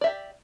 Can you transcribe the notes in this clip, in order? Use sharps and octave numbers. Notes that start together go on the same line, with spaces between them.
G4 D5 E5